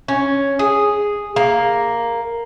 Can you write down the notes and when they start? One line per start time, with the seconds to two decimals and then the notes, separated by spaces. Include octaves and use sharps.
0.08 C#4
0.59 G#4
1.36 A#3